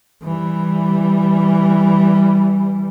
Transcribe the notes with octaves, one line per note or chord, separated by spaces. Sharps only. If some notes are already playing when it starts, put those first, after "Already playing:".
E3 G3